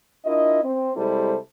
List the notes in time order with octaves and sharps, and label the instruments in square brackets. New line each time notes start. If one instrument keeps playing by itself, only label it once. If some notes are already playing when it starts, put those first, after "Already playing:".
[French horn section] D4 E4 F4 A#4 D#5
C4
C3 G3 G#3 E4 A4 C5